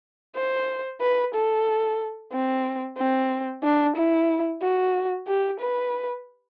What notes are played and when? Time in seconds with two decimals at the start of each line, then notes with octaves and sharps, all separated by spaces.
0.36 C5
1.01 B4
1.34 A4
2.33 C4
2.98 C4
3.63 D4
3.96 E4
4.62 F#4
5.27 G4
5.60 B4